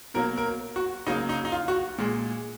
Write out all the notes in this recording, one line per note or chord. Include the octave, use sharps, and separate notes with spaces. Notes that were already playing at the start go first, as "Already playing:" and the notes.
B2 F#3 A#3 A#4
A#4
F#4
C#3 F#3 A#3 D#4
D#4
D#4
F4
F#4
A#2 G#3